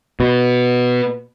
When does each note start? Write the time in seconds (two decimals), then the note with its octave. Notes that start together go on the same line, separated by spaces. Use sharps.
0.20 B2